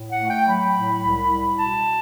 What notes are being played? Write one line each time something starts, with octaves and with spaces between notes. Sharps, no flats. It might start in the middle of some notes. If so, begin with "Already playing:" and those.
Already playing: A2
F#5
A3
G5
F#3 B5
A2
C2
G3
B2 A5